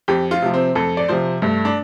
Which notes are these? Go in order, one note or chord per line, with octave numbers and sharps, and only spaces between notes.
F2 G4
F4
C3 F3
C4
F2 A4
D5
C3 F3 C5
G2 A3
D4